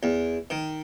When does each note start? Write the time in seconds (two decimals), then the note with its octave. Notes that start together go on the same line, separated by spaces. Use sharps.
0.03 E2
0.50 D#3